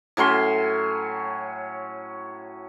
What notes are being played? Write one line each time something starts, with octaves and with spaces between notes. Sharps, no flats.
A2 F#3 C#4 C6